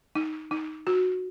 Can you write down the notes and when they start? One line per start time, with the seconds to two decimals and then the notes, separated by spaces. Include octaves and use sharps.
0.15 D#4
0.51 D#4
0.87 F#4